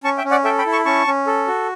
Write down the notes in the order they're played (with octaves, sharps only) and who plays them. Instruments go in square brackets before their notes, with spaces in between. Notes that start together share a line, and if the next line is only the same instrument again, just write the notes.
[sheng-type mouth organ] C#4 A5 C#6
E5 G5
C#4
D5 F#5
A4 E5 G5
G5 B5
E4
A5 C#6
C#4 A5 C#6
C#4
A4
F#4